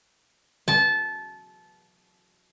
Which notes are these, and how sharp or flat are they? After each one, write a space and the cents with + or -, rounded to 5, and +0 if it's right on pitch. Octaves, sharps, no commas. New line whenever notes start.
A5 -20